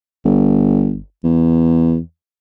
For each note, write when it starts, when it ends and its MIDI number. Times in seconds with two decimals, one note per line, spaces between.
0.25 0.99 31
1.24 1.99 40